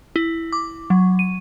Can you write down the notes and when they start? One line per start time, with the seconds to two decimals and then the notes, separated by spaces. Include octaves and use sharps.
0.16 E4
0.53 D6
0.90 F#3
1.19 D#7